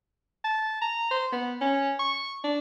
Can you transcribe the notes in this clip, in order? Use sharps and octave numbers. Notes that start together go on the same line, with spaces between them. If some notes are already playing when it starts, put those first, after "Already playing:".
A5
A#5
C5
B3
C#4
C#6
D4